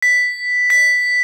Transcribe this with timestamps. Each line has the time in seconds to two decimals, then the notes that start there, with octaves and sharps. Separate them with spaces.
0.02 B6
0.70 B6